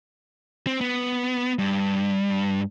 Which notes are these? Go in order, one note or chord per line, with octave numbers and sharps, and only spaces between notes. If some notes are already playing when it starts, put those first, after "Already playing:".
C4
B3
G2